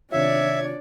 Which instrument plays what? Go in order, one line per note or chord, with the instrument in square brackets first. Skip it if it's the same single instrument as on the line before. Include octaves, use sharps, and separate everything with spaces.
[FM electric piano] C3 D#3 F4 [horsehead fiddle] D4 D5 [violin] C#5 G#6 [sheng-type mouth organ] E5